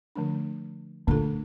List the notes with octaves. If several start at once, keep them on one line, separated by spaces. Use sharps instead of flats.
D3 F3 A3 D4
A#2 D3 A3 D4 F4 A4